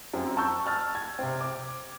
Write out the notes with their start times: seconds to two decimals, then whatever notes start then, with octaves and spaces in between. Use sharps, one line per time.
0.13 F#2 C4
0.37 A5 C#6 E6 G6
0.66 A5 F6 A6
0.95 G#6
1.19 C3 C4
1.41 D6